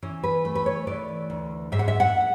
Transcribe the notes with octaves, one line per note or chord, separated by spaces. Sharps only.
E3 C#4
B4
A3
B4
C#5
E3 D5
D2
G#2 E5
F#5
E5
F#5